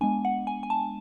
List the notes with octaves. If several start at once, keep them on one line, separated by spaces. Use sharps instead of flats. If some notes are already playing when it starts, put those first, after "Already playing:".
G#3 B3 D4 G#5
F#5
G#5
G#5
A5